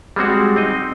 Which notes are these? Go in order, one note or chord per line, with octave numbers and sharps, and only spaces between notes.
G3 G#3 C4 F#4
C4 D#4 D#5